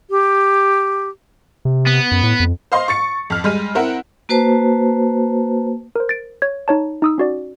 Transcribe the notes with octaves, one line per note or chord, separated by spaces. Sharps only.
G4
C3
B3
F#2
A2
F2
C5 D#5 F5 C6
C#6 A6 C#7
F2 F6
G3 G#3 F6 D#7
C4 E4 A#4 F#5
A#3 F#4 B4 C5 A5
A#4 C5
A6 D7
C#5 G#6
D#4 C#5 A5
D#4 D#6 E6
C#4 F#4 D5